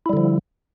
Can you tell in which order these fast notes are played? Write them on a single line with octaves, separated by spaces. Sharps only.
E4 G3 D3 F3